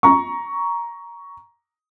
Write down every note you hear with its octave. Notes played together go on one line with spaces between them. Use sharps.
A#5 C#6